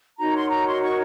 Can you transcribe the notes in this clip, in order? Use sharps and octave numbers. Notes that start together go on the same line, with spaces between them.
D#4 F#4 A#4 C#5 A#5
C6
A#5
C6
C#6